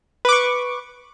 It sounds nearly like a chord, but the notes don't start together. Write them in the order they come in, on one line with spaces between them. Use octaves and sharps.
B4 D6 C#6